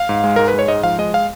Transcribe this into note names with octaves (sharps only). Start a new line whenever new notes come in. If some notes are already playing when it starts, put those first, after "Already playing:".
Already playing: F5
G#2
G#3
G#2 A#4
B4
G#3 C#5
G#2 D#5
F3 F5
G#3 D#5
F5